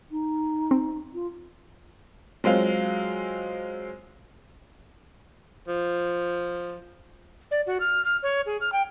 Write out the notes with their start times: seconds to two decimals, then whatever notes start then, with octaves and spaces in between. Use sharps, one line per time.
0.11 D#4
0.71 C4
1.14 F4
2.44 F#3 G#3 C4 F4
5.68 F3
7.51 D5
7.67 F#4
7.80 F6
8.05 F6
8.23 C#5
8.46 G#4
8.61 F6
8.73 G5